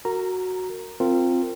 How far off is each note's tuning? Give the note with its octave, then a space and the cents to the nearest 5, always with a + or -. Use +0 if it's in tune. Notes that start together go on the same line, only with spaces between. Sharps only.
F#4 +0 A#4 -25 A#5 +0
C4 +0 F4 +0 A#4 -25